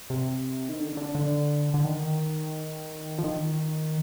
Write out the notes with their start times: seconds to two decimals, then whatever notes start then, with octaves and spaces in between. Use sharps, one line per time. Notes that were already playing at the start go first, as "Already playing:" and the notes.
0.10 C3
0.69 D#3
0.80 D3
0.97 D3
1.15 D3
1.74 D3
1.84 D#3
3.18 F3
3.24 D#3